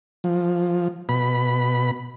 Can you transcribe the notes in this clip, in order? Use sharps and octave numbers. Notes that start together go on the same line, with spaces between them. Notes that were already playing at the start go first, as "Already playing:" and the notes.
F3
B2 B5